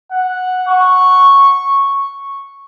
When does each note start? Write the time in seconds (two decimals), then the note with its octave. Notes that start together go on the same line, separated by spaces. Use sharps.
0.11 F#5
0.68 C#6